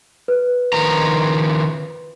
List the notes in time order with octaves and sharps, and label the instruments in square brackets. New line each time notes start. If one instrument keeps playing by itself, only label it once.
[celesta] B4
[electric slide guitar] D#3 F3 A#5